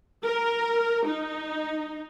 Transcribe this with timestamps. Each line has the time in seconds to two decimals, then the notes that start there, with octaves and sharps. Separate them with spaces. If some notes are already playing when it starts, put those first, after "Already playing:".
0.24 A#4
1.06 D#4